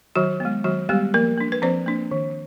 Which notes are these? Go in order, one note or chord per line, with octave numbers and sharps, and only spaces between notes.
D#3 F#3 F#4
G#3 B3
D#3 F#3 F#4
G3 G#3 B3 G4
F3 A#3 A#4
A#3 D4
B4
F3 C4 C5
A#3 D4
D#3